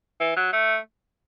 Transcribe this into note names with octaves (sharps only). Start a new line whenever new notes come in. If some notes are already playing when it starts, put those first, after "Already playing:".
E3
F#3
A3